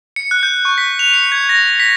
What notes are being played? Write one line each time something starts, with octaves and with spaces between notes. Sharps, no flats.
C#7
F#6
G6
C#6
B6
F7
C#7
G#6
A#6
B6